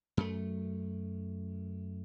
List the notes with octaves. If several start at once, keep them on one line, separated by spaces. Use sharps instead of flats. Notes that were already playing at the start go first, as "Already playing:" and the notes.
F#2 A3